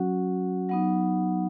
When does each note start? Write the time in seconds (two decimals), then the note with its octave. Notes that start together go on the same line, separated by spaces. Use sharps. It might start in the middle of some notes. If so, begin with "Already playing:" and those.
Already playing: F#3 C#4 F#4 F#5
0.69 F#3 B3 D#4 F#5